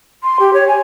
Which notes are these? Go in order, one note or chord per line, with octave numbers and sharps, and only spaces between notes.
C6
G4
C#5
G#5